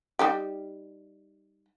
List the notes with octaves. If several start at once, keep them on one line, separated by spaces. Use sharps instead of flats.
G3 D#4 G4